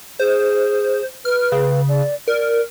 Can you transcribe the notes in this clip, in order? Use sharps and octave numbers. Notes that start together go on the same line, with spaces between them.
G#4 C5
B4 F6
C#3
D5
A#4 D5